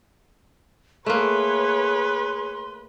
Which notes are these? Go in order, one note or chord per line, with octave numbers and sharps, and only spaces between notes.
A3 A#3 G#4 B4 C#5 C6